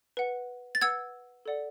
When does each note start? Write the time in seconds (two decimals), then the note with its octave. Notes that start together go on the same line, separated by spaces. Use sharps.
0.17 B4 F#5
0.75 A6
0.82 B4 F#5 E6 G#6
1.46 A4 D5 F#5